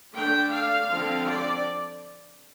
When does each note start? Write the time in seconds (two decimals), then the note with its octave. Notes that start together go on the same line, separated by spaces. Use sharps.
0.15 D3 A3 D4 G5
0.52 F5
0.89 D3 F3 C4
1.26 D5